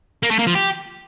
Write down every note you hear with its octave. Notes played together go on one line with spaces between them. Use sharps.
A#3
A3
A#3
F3
G4